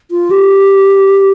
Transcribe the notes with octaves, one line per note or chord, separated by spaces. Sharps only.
F4
G4